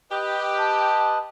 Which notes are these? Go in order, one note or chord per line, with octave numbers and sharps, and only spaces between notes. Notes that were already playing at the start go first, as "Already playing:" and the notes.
G4 B4 D#5
A5